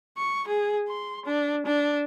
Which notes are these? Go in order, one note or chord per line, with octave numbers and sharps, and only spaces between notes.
C#6
G#4
C6
D4
D4